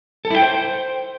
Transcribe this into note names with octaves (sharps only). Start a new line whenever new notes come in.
A4
E4
G5
C5